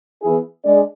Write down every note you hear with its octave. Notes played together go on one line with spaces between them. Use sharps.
E3 B3 E4 G#4
G#3 D4 G#4 D5